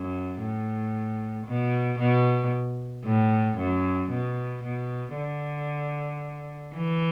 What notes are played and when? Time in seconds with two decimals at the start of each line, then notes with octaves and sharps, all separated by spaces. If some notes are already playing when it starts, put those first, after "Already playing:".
Already playing: F#2
0.40 A2
1.46 B2
1.99 B2
3.04 A2
3.58 F#2
4.10 B2
4.64 B2
5.16 D3
6.75 E3